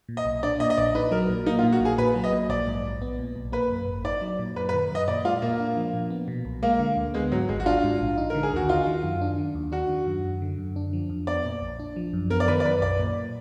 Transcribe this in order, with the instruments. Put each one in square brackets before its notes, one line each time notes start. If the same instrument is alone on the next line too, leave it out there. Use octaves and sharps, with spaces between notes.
[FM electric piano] A#2
[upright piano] D#5
[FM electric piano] B1
[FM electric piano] D4 [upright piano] D5
[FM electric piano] A#2 [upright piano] D#5
[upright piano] D#5
[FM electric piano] A#1 [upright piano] D5
[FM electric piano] D#4 [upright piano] B4
[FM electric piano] F#3 [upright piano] A#4
[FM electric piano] A#2
[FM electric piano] A#3 [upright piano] D#4
[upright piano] F4
[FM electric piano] A#2
[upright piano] F#4
[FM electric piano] A#1
[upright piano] G#4
[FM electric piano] A#2 [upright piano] B4
[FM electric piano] F#3
[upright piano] D#5
[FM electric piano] A#2
[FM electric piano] A#1 [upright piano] D5
[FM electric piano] G#2
A#1
B3
A#2
B1
[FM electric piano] A#3 [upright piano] B4
[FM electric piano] F#2
G#1
[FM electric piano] D#4 [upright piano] D5
[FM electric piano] F#3
A#2
[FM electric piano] F#2 [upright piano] B4
[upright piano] B4
[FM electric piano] D#3
[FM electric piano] F#2 [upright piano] D#5
[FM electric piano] A#2 [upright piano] D5
[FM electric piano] G#3 [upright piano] F4
[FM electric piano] A#2 [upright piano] A#3
[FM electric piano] D4
F3
A#2
B3
B2
B1
[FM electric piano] G#3 [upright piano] A#3
[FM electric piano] D3
D2
[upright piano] G#3 [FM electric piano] B3
[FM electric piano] G#2 [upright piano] F#3
[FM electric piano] G#1 [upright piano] G#3
[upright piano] F#4
[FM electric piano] D4 [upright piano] F4
[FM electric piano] G#2
A#1
D#4
[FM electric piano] D3 [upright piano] A#4
[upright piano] G#4
[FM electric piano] D#2 [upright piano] F#4
[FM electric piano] D#4 [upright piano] F4
[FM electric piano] D#3
F#2
D4
D#3
D#2
[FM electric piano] D4 [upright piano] F#4
[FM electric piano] D#3
F#2
F#2
D3
F#2
D4
F3
F2
[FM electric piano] B3 [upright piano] D5
[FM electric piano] A#2
A#1
D4
F3
F#2
[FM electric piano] B3 [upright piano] A#4
[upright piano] D5
[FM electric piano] D#3 [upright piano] B4
[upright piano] D5
[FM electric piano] F#2 [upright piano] B4
[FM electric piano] B1 [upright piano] D5
[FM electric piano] A#2